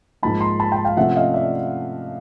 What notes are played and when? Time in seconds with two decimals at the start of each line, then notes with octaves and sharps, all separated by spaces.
0.23 G#2 F3 A#3 D#4 A5 B5
0.41 A#5 C6
0.60 A5 B5
0.72 G5 A5
0.85 F5 G5
0.97 C3 F3 A3 C#4 E5 F#5
1.16 D#5 F5
1.34 D5 E5